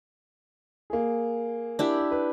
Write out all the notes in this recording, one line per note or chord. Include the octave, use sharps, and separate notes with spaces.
A#3 G#4
D4 E4 G4
B4